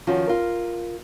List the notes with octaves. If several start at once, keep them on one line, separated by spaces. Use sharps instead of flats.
D#3 F3 C#4 F4 F#4
F4 A#4